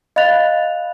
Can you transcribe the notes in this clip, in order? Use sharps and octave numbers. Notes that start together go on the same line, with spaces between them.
D#5 F5 B5 F#6 A6 F7